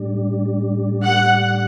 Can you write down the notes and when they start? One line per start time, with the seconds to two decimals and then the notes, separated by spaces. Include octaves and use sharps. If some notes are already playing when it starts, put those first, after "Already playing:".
Already playing: A2 G3 D4
1.05 F#5